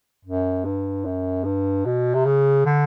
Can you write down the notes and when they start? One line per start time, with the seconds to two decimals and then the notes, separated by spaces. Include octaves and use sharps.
0.25 F#2
0.65 G2
1.05 F#2
1.44 G2
1.85 B2
2.14 C3
2.25 C#3
2.66 D3